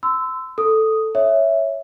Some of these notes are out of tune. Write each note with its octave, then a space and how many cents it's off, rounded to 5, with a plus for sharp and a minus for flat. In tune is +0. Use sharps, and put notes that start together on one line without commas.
C6 -35 E6 +0
A4 +0 D#6 +0
C#5 +0 E5 +0